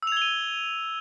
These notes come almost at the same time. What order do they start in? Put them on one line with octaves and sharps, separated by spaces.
E6 F7 G#6 G7 D#7